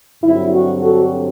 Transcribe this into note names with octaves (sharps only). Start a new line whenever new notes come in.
G2 D3 F#3 C4 E4
F#4
F#4 A4